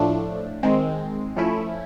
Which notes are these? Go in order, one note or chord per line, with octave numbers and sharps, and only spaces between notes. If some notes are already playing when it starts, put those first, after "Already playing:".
Already playing: A2 F3 A3 D4
D#3 G#3 C4
F3 A3 C#4 E4